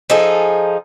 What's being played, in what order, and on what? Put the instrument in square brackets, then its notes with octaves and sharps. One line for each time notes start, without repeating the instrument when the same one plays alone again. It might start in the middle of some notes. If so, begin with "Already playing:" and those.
[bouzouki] F3 D#4 G#4 A4